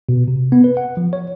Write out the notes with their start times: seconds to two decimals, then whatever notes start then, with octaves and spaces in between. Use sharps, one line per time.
0.09 B2
0.28 C3
0.52 B3
0.64 B4
0.77 F#5
0.97 F3
1.13 C#5